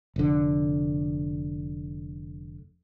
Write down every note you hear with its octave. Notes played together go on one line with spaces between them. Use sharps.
F1 D3